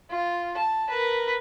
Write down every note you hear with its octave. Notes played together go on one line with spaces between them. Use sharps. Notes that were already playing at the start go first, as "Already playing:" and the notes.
F4
A5
A#4 B4